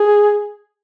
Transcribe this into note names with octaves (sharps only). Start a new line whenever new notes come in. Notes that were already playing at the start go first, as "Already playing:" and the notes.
Already playing: G#4